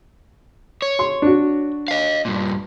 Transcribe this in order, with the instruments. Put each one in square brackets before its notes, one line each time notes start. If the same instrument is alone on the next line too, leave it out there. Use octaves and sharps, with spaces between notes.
[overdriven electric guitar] C#5
[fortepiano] C6
D4 F#4
[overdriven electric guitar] D#5 F5
G2 A#2